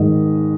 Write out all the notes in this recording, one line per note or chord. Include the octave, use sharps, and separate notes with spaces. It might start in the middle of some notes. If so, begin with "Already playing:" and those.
Already playing: G#2 D#3 D#5